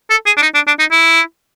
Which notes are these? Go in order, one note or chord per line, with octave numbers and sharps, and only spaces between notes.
A4
G#4
D4
D#4
D4
D4
D#4
E4